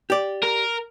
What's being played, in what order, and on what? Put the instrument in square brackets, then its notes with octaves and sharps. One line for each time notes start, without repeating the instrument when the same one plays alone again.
[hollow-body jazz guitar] G4 D5
[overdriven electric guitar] A#4